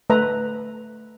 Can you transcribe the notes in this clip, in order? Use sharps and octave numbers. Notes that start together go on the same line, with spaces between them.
A3 B4 E5 A#5